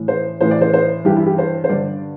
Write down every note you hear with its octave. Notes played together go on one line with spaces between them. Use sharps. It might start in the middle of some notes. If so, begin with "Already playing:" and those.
Already playing: A2 E3
C5
A2 E3 C5
D5
C5
C5
G2 E3 G4
E4
G4
C5
C5
G2 D3 D5